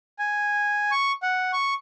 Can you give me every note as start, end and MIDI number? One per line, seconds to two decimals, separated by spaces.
0.19 0.91 80
0.91 1.12 85
1.23 1.51 78
1.53 1.74 85